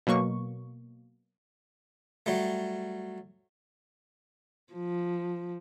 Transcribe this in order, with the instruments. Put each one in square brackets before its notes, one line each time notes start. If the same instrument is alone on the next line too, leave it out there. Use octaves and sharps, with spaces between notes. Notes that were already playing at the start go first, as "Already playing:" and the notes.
[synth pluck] B2 F#3 A#3 C#6
[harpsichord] F#3 G3 A3
[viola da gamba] F3